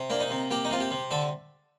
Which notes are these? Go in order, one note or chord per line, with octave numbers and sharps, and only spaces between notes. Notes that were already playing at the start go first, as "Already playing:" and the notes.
Already playing: C3
A#3 D4
D#4
C3
A#3 G4
D#4
C3 F4
G4
C3
D3 A4